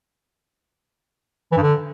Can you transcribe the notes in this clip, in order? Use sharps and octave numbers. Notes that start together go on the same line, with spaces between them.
E3
G2
D3